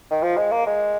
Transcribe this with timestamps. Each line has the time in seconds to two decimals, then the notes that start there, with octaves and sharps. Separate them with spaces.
0.11 D#3
0.23 F3
0.37 G#3
0.52 A#3
0.66 G#3